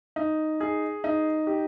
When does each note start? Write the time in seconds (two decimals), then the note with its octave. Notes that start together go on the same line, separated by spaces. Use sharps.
0.16 D#4
0.60 G#4
1.04 D#4
1.47 G4